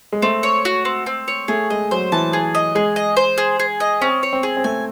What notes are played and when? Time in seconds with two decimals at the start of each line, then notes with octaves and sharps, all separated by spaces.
0.12 G#3
0.22 A3 C4
0.43 C#5
0.65 F#4
0.85 C4
1.06 C4
1.28 C#5
1.48 A3 G#4
1.70 G#3 D#5
1.91 F#3 C5
2.12 E3 A5
2.33 G#4
2.55 D#5
2.75 G#3 G#4
2.96 D#5
3.17 C5
3.38 G#4
3.60 G#4
3.80 D#5
4.01 C4 C#4
4.23 C#5
4.33 C4
4.43 G#4
4.57 C4
4.64 A3 G#5